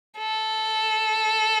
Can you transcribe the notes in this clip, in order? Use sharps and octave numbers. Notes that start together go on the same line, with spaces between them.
A4